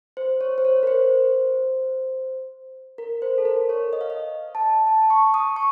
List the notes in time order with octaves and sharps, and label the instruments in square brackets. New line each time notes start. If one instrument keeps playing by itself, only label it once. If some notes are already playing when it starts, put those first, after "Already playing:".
[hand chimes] C5
C#5
C5
C#5
A#4
C5
A#4
C5
A4
A#4
C#5
D#5
F5
D#5
A5
A5
C#6
D#6
C#6